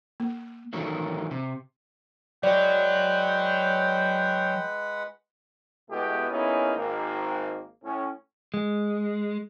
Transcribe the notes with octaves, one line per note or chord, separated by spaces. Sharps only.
A#3
D#3 E3 F#3 A3 A#3
C3
F#3 G#3 B4 D5 F#5 G5
B2 G#3 A3 B3 E4 G4
A#3 B3 C#4 D#4 E4 G#4
G#1 A#3
A2 C#4
G#3